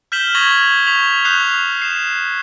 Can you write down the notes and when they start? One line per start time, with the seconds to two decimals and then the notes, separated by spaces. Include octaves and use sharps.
0.12 F6 G6 B6 E7 F#7 G7
0.35 C#6 D#6 G#6 A#6 F7 F#7
0.86 C#6 B6 F7 F#7
1.25 C#6 D#6 F#6 G6 C7 F7
1.82 C7 E7